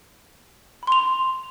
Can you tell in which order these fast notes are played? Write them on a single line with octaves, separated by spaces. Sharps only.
B5 C6 F7